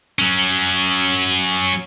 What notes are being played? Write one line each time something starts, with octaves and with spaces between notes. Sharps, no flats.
F#3 C#4